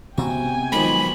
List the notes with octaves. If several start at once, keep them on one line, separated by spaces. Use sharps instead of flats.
C3 B3 F#4 G5 G#5
B1 D#3 F3 G#3 B5